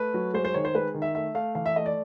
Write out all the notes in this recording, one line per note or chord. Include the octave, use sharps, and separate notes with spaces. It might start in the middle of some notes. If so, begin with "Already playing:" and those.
Already playing: A3 B4
F#3
G#3 C5
C5
D#3 C#5
C5
G#3 B4
D#3
E5
A3 E5
A3 F5
E3 F5
E5
A3 D#5
D5